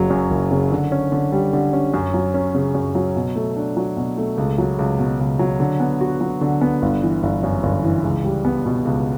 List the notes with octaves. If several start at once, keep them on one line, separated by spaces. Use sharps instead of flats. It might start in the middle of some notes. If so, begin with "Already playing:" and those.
Already playing: F#1 C#3 F#3
F#2
F#1
C#3
D3
C#4
D3
G3
D3
C#4
F#2
F#3
C#4
C#3
F#2
F#3
B2
A3
D4
F#3
B2
A3
C#2
F#3
C#2
B2
C#2
F#3
D3
B3
F#4
F#3
D3
B3
G1
E3
G1
F#2
G1
E3
C#2
G3
B3
B2
C#2